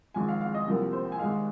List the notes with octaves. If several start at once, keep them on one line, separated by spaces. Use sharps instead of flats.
G#1 G#2 F3 G#5
F5
F5
D#5
C2 C3 F3 A#3
C5
G#5
G#1 G#2 G#3 F5